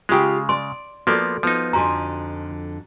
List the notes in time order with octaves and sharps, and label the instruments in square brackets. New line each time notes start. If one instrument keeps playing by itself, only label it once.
[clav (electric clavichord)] C#3 G#3 [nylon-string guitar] F4 G4 G5
[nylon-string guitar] D5 [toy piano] C6
[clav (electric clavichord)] F3 A#3 B3 [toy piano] F#4 A4 [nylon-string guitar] D5
[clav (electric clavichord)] F3 D#4 [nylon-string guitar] B3
[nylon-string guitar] F2 D3 G#5 [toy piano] F#4 A#5